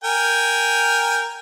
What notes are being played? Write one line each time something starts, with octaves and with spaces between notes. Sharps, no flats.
A#4 G5 G#5